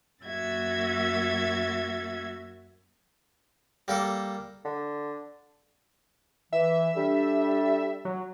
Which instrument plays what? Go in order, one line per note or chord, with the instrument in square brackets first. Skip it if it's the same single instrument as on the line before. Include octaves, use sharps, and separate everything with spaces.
[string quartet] F#2 A#3 F#4 E5 G#6 A6
[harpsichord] G3 A#3 A4
[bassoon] D3
[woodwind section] E3 [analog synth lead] E5
[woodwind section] G3 D4 A4
[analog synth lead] F#3